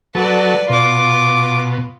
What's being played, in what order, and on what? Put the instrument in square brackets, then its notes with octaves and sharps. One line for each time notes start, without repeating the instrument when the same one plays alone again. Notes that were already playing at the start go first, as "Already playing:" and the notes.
[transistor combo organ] F#3 A4 [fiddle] B4 D5
[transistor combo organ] B2 [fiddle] F4 D6